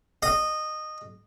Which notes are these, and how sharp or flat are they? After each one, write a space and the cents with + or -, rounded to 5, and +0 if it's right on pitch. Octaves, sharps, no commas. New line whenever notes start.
D#5 -15